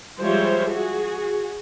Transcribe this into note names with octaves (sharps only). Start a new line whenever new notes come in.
F3 G3 G#3 C5 C#5 E5
F#4 G#4